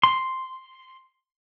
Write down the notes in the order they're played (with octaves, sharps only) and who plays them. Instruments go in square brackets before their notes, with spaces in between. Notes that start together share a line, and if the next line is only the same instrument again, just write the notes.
[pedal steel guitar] C6